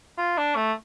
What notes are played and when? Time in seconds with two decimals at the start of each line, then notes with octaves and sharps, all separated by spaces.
0.18 F4
0.38 D4
0.56 A3